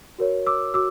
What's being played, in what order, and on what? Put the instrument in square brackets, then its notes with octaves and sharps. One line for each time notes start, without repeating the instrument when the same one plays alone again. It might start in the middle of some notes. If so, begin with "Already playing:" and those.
[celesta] F#4 A#4 C#5
D6 E6
F#4 D6 E6